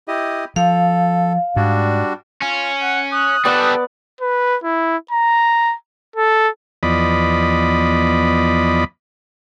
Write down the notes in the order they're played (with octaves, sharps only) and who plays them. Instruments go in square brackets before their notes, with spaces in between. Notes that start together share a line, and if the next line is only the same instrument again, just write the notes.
[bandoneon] E4 G4 D#5
[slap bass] F3 [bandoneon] A4 [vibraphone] F5
[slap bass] G#2 [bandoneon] G3 D4 F#4
[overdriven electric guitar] C#4 [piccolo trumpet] F4
[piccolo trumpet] F#5
[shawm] D#6 [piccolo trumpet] F#6
[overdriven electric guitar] G3 A4 [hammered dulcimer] B3 D5 [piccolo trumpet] F#6
[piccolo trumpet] B4
E4
A#5
A4
[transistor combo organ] E2 F3 B3 D5 D#5 B5